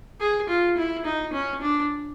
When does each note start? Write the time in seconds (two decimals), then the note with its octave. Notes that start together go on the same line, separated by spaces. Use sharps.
0.20 G#4
0.49 F4
0.77 E4
1.05 D#4
1.33 C#4
1.62 D4